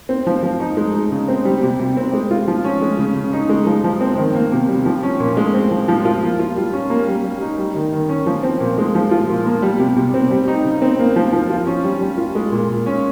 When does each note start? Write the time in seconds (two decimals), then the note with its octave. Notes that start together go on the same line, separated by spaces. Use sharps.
0.09 C4
0.27 F3
0.43 F3
0.60 D#4
0.77 G#3
0.94 D#4
1.11 C#3
1.28 C4
1.45 G3
1.62 C3
1.79 C3
1.97 C4
2.13 G#3
2.31 F4
2.48 F3
2.65 C#4
2.82 G#3
2.99 C#3
3.16 C#3
3.33 D#4
3.49 G#3
3.67 F3
3.84 F3
4.01 C4
4.18 D#3
4.35 A#3
4.52 C3
4.69 G3
4.86 F3
5.03 C#4
5.20 A#2
5.37 G#3
5.54 C4
5.71 F3
5.88 F3
6.05 F4
6.22 A#3
6.39 F4
6.56 G3
6.73 C#4
6.90 A#3
7.07 G3
7.24 G3
7.41 D#4
7.58 G3
7.75 D#3
7.92 D#3
8.09 C#4
8.26 F3
8.43 C4
8.60 A#2
8.78 G#3
8.95 F3
9.11 F4
9.29 A#2
9.46 A#3
9.62 G3
9.80 C3
9.96 C3
10.14 C4
10.31 G3
10.48 D#4
10.65 C#3
10.82 C4
10.99 A#3
11.16 F3
11.33 F3
11.50 F4
11.67 C#4
11.84 G3
12.01 G3
12.18 F4
12.35 G#3
12.52 A#2
12.69 A#2
12.86 C#4